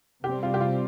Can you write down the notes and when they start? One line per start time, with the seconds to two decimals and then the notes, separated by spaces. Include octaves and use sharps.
0.23 C3 G3 C4 G4
0.43 F4
0.54 G4
0.61 F4